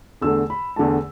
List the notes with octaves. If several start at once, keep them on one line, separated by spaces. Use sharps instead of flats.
E2 D3 A3 E6
B5
E2 D3 A3 A5